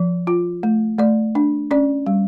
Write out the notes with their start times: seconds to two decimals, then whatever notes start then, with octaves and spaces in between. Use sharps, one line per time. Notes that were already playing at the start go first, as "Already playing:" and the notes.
Already playing: F3
0.27 F4
0.63 A3
0.99 A3 D5
1.35 D4
1.71 C#4 D5
2.06 G3